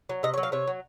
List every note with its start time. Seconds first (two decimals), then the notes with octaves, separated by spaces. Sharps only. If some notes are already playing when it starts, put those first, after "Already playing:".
0.09 F#3
0.23 C3 D#5
0.34 C#5
0.38 F#3
0.43 F5
0.52 C3 C#5
0.67 F#3